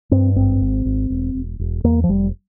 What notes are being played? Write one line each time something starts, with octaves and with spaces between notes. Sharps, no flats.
G2 C4
G#1 C4
G#1
G#1
E1
E1
E1
E2 A#3
F3
F1 G3